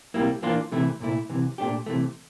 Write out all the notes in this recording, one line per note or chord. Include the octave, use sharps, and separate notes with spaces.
C2 C3 G3 A#3 E4
E3 A#3 D4 F4
C3 E3 A3 E4
C2 A#2 A3 E4
C2 C3 E3
A#2 A3 D4 G4
C3 E3 A3